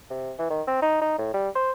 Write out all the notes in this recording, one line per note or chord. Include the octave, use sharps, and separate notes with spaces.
C3
E3
D#3
C4
D#4
D#4
A2
G3
C5